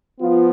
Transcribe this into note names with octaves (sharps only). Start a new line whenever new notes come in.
F3 B3 F4